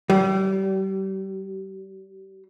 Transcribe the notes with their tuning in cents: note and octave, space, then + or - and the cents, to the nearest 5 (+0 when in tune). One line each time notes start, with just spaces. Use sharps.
G3 -35